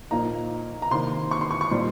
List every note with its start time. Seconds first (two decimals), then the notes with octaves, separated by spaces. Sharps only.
0.11 A#2 F3 A#3 D#4 A#5
0.82 A#5
0.91 C3 D#3 A#3 C6
1.31 C#6
1.41 C6
1.51 C#6
1.61 C#6
1.71 A#2 G3 C4 D#4 C6